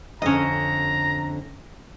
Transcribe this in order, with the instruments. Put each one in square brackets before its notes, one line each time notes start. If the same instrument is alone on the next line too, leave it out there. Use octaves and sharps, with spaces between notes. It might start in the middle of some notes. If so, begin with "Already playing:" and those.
[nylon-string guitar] F2 D3 [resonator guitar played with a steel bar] C#4 D#5 [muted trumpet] A#5